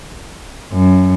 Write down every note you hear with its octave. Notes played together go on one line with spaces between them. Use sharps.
F#2